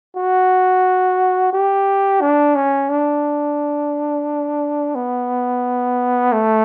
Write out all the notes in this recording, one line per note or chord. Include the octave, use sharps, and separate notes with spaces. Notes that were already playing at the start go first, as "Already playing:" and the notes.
F#4
G4
D4
C#4
D4
B3
A3